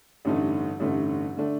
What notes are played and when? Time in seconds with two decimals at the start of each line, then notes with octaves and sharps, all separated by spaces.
0.25 A1 G2 D3 A3 D#4
0.80 A1 G2 D3 A3 D#4
1.37 D3 A3 D4